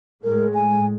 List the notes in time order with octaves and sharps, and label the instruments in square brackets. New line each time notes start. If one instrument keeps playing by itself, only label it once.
[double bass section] A2 G#3 [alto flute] A#4
[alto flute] G#5